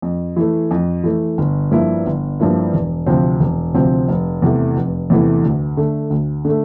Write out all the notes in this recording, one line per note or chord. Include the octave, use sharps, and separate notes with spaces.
F2
E3 A3
F2
E3 A3
G1
G2 F3 A#3 E4
G1
G2 F3 A#3 E4
E1
D2 C3 F3 C4
E1
D2 C3 F3 C4
F1
E2 C3 E3 A3
F1
E2 C3 E3 A3
D2
D3 A3
D2
D3 A3